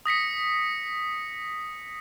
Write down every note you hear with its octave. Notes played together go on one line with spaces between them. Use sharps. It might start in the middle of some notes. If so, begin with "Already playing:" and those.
D#6 A#6 B6 C#7